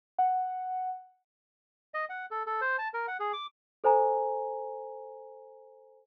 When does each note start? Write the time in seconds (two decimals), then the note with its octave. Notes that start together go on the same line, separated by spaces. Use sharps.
0.18 F#5
1.94 D#5
2.09 F#5
2.31 A4
2.47 A4
2.61 C5
2.78 A5
2.94 A#4
3.08 F#5
3.20 G#4
3.33 D6
3.84 A4 C5 G#5 A#5